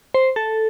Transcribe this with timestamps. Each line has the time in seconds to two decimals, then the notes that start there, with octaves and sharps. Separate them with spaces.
0.14 C5
0.36 A4